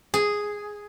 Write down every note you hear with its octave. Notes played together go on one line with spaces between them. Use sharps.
G#4